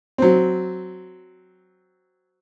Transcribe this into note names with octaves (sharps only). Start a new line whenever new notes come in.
F#3 C4